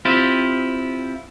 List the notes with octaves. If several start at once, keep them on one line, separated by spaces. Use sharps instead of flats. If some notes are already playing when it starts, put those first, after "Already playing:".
C4 E4 F4 G4